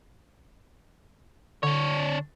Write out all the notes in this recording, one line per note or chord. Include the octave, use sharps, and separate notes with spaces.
D3 D4 C#5